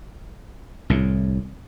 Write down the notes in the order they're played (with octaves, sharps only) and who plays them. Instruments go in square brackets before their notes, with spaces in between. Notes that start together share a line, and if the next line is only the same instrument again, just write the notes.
[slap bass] C2 A2